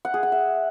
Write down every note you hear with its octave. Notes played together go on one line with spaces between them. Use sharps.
F#5
G#4
F#5
E5